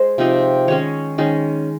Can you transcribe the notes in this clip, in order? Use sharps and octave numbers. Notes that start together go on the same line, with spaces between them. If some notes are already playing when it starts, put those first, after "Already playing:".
Already playing: G#3 C5
C3 F3 C4 D#4
D#3 G#3 C#4 C#5
D#3 G#3 C#4